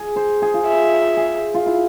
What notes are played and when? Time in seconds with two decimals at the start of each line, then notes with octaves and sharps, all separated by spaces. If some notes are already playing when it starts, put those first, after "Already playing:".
Already playing: G#4
0.16 C5
0.42 G#4
0.54 F4
0.67 E5
1.17 G#4
1.54 F4
1.66 E4